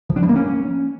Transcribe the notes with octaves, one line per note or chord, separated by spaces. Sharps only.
F3
D4
G3
A#3
C#4